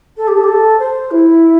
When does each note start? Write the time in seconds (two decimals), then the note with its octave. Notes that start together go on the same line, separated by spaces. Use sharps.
0.16 A4
0.27 G4
0.37 A4
0.43 G4
0.48 A4
0.79 C5
1.10 E4